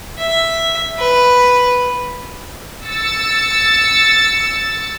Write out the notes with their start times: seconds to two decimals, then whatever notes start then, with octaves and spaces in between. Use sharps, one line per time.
0.19 E5
0.99 B4
2.86 E6 A6 C#7